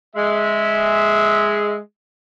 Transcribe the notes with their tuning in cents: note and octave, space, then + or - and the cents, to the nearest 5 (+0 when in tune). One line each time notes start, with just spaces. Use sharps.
G#3 +0 E5 -15